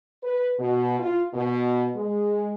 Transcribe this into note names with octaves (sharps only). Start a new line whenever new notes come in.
B4
B2
F4
B2
G#3